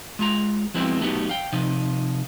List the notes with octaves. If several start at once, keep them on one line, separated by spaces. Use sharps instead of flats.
G#3 F4 A#5
F3 F#3 G#3 B3 C4 E4
F#3 A3 B3 C#4 D#4 G4
F5 G5
C3 F3 D#4